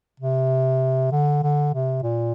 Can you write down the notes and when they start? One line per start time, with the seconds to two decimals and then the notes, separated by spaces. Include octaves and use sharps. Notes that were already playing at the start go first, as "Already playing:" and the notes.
0.20 C3
1.12 D3
1.43 D3
1.74 C3
2.03 A#2